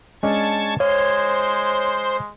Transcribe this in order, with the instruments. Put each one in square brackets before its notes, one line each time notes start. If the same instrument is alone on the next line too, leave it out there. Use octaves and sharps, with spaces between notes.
[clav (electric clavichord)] G#3 C#4 D4 [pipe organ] A5 C#6 G#6
[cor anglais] G#3 [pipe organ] C5 C6 [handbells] C#5 [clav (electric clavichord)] F5